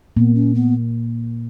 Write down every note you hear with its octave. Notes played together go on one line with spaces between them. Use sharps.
A#2 A#3 B3
C#4
B3